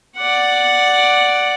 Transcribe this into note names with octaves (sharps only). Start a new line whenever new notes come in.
D5 F#5